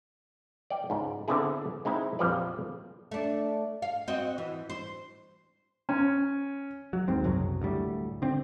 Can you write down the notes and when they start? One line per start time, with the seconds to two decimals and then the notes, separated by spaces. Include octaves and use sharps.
0.70 D5 D#5 G5
0.90 C#2 G#2
1.28 D3 B3 C4 D4 E4 G#4
1.85 G#3 C4 D#4 E4
2.19 A#1 F2 F3 G3 B4 D5
3.11 A3 D4
3.82 F5
4.08 C4 F#4 D#5
4.38 E3
4.70 C5
5.89 C#4
6.93 F#3
7.08 D#2 G#2 C4
7.24 F#1 C2 F#2 F#3
7.62 D2 A2 G3
8.22 D3 C4